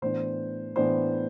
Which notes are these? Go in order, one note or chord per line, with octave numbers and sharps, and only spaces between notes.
A2 E3 B3 D4 C5
A2 E3 B3 D4 C5